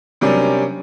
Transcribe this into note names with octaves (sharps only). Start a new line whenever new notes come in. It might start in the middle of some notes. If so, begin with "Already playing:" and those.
C3 F#3 G3 A#3 C#4 D4